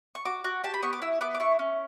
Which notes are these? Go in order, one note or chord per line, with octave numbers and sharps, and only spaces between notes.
C#6
F#4 D6
F#4
G4 A5
B5
B3 C#6
D6
E4 E6
B3 D6
D6
E4 C#6
C#4